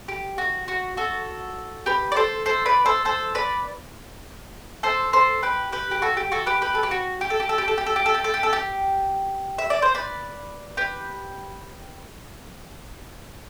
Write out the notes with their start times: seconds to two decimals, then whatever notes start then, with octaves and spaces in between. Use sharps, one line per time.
0.08 G4
0.38 F#4
0.68 F#4
0.97 F#4 A4
1.86 G4 B4
2.12 D5
2.16 A4 C5
2.46 A4 C5
2.66 B4 D5
2.86 A4 C5
3.05 A4 C5
3.35 B4 D5
4.83 A4 C5
5.13 A4 C5
5.43 G4 B4
5.72 G4 B4
5.91 G4
6.02 F#4 A4
6.17 G4
6.32 F#4 A4
6.46 G4 B4
6.62 G4 B4
6.75 A4
6.83 G4
6.91 F#4
7.21 G4
7.30 A4
7.40 G4
7.49 A4
7.58 G4
7.68 A4
7.78 G4
7.86 A4
7.96 G4
8.06 A4
8.14 G4
8.24 A4
8.34 G4
8.43 A4
8.53 G4
9.58 E5
9.70 D5
9.82 C5
9.95 B4 D5
10.77 G4 B4